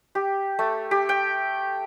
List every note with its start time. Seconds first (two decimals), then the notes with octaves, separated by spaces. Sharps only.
0.15 G4
0.59 A3
0.91 G4
1.09 G5